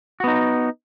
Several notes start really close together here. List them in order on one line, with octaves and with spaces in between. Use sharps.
F#4 B3 D#4